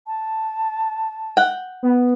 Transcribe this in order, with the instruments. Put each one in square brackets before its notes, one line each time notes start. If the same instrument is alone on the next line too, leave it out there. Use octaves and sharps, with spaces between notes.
[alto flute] A5
[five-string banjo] F#5 G5
[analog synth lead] B3